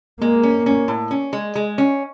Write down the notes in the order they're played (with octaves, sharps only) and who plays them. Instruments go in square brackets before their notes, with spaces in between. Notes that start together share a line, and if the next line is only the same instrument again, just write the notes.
[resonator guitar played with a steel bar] G#3 [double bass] A#3
[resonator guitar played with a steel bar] C#4
C#4
A2
C#4
G#3
G#3
C#4